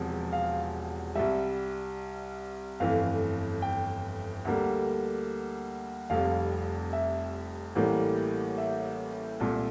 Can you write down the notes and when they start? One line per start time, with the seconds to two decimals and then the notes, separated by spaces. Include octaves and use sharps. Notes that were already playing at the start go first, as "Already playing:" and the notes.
Already playing: E1 E2 C3 F3
0.33 F5
1.15 C2 C3 G3 E5
2.80 G1 F2 E3 A3 F5
3.62 G5
4.45 D2 D3 G3 A#3
6.10 F1 F2 C3 G3 F5
6.93 E5
7.75 A1 A2 E3 G3 A#3
8.58 E5
9.40 C2 A#2 A3